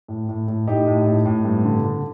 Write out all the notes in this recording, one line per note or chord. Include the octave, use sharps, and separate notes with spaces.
A2
A2
A2
A2 D#4 G4
A2
A2
A2
G2
D3
D3